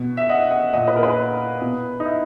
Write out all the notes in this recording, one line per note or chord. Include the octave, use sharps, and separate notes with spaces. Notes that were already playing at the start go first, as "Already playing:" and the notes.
Already playing: B2
E5
D#5 F#5
D#5 F#5
A#2 D#5 F#5
B4 D#5
A#4
G#4 B4
B2
D#4
E4